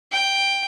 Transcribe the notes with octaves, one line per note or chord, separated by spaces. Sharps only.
G5